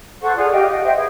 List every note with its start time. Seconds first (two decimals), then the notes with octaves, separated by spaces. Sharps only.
0.21 A4 C5 F#5 C#6
0.35 F4 G#4 D5 F#5
0.52 G4 D#5 F5
0.68 D#5 F#5
0.84 C5 D#5 E5 G5
0.95 G#4 B4